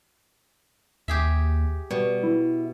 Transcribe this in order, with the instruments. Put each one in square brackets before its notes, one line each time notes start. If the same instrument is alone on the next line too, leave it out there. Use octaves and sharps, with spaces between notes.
[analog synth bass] D#2 [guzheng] G4 G#4 E5
[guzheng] B2 [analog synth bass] G3
[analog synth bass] E4